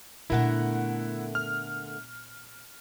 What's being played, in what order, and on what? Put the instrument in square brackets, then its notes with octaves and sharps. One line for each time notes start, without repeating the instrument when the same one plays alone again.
[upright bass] A#2 B3 [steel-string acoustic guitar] D3 A3 A#4 [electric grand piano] E4 F#5
[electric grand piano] F6